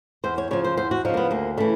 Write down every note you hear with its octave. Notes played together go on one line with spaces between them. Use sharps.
E2 C5
C#5
C#3 F3 C#5
C5
E2 C5
F#4
C#3 F3 D#4
A#3
B3
D2 A#3
C#3 E3 A3